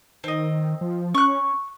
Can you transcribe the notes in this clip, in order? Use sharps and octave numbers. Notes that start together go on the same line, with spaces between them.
D#3 C4 D#5
D#3
F3
C#4 C#6 F#6